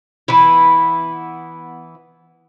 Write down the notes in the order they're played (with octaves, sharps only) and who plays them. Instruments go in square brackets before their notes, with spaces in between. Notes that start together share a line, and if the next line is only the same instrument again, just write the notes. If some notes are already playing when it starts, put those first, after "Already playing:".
[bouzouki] E3 B3 E4